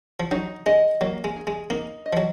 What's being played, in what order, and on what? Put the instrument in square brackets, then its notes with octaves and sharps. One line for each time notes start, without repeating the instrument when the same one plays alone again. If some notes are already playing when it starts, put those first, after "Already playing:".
[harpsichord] F3
[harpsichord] F#3 [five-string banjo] D#4
[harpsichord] G#3 [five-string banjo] D#5
[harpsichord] F#3 [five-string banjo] A#3
[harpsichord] G#3
[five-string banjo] G#4
[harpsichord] G#3
[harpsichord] A#3 [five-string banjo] D#4
[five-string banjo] D#5
[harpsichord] F3
F#3